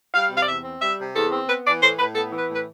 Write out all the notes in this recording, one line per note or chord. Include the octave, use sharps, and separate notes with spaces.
G3 F5
C3 F5
D5
E2 E5
C4
G3 E5
C3
E2 A4
C4
B3 B4
E3 D5
A2 C5
A2 B4
B3 A4
E3
B4
A2 B4